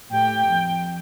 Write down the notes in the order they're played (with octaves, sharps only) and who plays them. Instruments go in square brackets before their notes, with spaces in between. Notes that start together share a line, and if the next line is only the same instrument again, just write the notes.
[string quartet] A2 G4 [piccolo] G5
[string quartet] F2